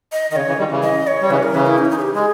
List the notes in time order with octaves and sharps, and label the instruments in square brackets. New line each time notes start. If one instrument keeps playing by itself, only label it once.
[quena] D#5
[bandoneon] D#3 [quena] D#5
[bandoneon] C#3 [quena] C#5
[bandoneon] C#3 E3
D#3 G3
C#3 E3
[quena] D#5
C#5
[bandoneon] G3
[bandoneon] C#3 E3 [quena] B4
[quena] A#4
[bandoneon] C#3 E3 [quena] B4
[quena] E4
D#4
E4
D#4
G#4
G4
[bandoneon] G#3 [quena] G#4